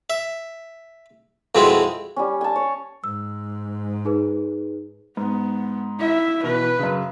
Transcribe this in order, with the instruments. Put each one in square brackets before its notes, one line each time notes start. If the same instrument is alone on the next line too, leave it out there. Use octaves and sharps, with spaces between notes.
[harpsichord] E5
F2 B2 F3 G#3 C4 E4
[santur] G3 C#4
G#5 A5
C#5
[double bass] G#2 [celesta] E6
[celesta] D#4 G#4 B4
[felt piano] G#2 [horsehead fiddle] B3
[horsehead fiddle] E4 E5
[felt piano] B2 E3 [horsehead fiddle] B4
[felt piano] F#2 C#3